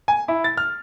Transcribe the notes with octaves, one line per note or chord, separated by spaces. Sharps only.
G#5
E4
A6
F6